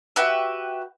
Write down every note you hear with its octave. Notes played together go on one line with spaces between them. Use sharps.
F#4 G4 B4 E5